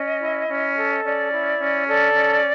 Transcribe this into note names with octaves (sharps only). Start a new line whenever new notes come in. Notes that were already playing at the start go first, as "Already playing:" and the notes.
Already playing: C#4 D#5
E4
C#4
A4
C#4 D5
E4
C#4
A4 D5
C#4